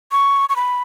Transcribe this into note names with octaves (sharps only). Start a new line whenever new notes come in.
C#6
C#6
B5